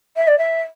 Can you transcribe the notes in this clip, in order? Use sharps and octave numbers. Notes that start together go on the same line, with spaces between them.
E5
D5
E5